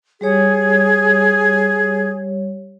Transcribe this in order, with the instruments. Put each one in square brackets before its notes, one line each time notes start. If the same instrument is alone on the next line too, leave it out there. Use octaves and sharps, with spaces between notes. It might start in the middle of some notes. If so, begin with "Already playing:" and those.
[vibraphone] G3 G4 C#5 [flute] G#4